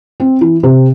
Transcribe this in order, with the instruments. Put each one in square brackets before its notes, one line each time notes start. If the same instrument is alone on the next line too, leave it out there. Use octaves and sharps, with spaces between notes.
[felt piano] C4
E3
C3